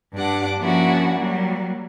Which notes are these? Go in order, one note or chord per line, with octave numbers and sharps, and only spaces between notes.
G2 D4 G4 F#5 D6
F3 A#3 C#4 D4 E4 F#4
F#3 G3 A#3